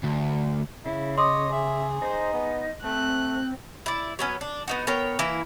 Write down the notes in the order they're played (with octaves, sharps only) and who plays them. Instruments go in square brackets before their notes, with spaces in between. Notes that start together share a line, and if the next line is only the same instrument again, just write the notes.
[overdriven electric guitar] D2
[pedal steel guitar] C#3 [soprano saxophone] E4
[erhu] C#5 [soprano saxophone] D#5 [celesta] C6 D6 D#6
[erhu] G#4 [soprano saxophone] E5
[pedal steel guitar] D#4 [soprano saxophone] C5
[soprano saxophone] B3
[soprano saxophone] A3 [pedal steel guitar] C4 [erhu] F#6
[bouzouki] E4 D5
F#3 B3 C#4
D4
B3 D#4 F#4
B3 A#4 C#5 G5
E3 A#3 E4